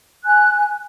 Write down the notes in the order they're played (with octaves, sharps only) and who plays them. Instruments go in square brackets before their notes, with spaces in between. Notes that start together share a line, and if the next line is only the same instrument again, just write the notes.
[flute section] G#5 F#6